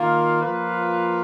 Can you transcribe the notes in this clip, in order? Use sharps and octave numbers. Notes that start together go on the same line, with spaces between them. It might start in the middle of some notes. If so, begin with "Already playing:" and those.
Already playing: D#3 A#3 F4
F3 A#3 F4 B4